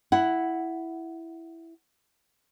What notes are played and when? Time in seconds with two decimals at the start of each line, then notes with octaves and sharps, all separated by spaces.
0.12 E4 F#5